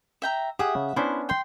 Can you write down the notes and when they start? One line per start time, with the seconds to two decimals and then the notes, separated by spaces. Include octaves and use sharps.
0.22 E5 G5 A#5
0.59 G4 G#4 E5 F#5 D#6
0.75 C#3
0.96 B3 C#4 D4 E4 C5
1.29 G5 C6